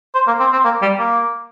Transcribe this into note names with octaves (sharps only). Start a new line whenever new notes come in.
C5
A#3
C4
C4
A#3
G3
A#3